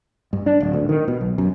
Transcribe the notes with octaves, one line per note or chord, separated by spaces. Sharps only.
G2
D4
D1
D2
D#3
B2
B1
F#2